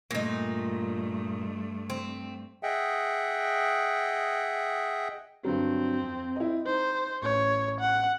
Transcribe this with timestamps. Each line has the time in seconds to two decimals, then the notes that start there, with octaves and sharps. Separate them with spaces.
0.11 G2 A#2 A3 D#4
1.90 C4
2.63 G#4 D#5 E5 F#5 G5
5.45 G2 D3 F#3 C4
6.01 F2
6.36 E4 D#5
6.66 D#4 C5
7.22 A1 C#5
7.80 F#5